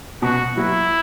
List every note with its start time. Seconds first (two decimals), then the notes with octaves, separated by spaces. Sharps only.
0.22 B2 F#4
0.57 F#3 B3 E4 F#4